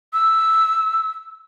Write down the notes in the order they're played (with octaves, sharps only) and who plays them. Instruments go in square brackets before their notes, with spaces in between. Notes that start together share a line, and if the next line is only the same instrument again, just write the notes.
[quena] E6